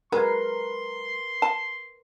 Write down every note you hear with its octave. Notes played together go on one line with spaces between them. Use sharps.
F#3 G#3 A#4 B4 C6
A5